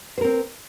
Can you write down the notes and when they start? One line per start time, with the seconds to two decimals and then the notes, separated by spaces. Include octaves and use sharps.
0.18 C5
0.21 A#4
0.24 C4